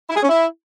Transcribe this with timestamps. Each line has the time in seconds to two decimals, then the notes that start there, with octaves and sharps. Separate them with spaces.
0.10 E4
0.16 G#4
0.23 C#4
0.29 E4